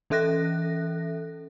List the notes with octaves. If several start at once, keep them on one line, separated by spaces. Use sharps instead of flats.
E3 C#4 A4 E5 F#6 A#6